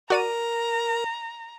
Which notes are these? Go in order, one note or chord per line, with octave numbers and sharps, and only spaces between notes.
F#4 A#4 D5 A#5 D#7